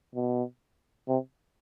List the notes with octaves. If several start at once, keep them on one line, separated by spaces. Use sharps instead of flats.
B2
C3